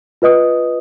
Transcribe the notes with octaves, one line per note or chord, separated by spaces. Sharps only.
F4 B4 D#5 D#6